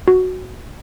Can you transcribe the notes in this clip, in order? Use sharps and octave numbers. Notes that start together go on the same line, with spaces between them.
F#4